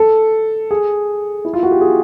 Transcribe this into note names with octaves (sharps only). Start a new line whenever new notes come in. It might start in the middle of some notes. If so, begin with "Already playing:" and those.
Already playing: A4
G#4
E4
F4
F#4
G4
G#4